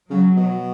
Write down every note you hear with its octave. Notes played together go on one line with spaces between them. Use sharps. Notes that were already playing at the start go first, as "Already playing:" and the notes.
C#3 F#3
B2